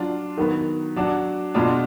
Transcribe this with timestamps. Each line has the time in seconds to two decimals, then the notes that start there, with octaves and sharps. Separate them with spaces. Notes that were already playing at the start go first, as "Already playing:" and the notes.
Already playing: F#3 D4 F4
0.37 D#3 F#3 B3
0.96 F#3 D4 F#4
1.54 B2 G#3 D4 F4